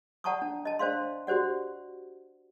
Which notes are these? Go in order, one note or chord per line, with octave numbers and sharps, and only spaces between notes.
D5 F#5 A5 A#5 C#6 D#6
D4
D#5 A5
D4 C5 D5 F5 C6
F#4 G4 C5 D5 F#5